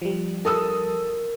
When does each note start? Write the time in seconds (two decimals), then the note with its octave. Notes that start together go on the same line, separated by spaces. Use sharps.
0.02 F3 G3
0.45 A4 A#4 D#6 E6